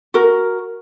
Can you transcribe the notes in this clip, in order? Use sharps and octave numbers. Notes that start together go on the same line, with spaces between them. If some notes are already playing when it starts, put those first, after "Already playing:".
F#4 A#4